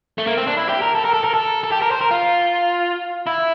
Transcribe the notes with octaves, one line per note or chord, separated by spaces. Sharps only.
A3
A#3
C4
D4
E4
G4
A#4
A4
A#4
A4
A#4
A4
A4
G4
A#4
C5
A#4
F4
E4